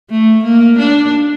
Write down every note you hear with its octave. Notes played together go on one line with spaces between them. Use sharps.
A3
A#3
D4